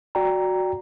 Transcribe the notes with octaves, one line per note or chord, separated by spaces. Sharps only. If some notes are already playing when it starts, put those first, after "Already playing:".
F#4 D5 G5 A#5